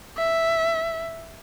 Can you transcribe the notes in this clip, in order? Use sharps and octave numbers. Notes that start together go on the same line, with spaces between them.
E5